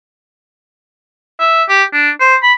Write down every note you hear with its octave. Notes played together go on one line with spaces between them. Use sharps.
E5
G4
D4
C5
B5